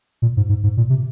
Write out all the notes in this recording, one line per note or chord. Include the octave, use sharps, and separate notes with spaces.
A#2
G#2
G#2
G#2
A#2
C3